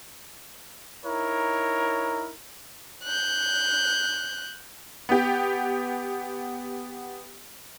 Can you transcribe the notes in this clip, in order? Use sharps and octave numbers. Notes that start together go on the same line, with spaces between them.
D#4 E4 A#4 C#5
F#6 G6
B3 G4